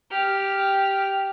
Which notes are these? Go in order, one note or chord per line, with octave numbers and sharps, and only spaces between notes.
G4 F6